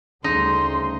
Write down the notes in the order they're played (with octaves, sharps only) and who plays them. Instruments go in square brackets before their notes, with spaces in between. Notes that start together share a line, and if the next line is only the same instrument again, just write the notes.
[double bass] D2 G3 [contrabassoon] C#3 [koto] D#4 [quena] C6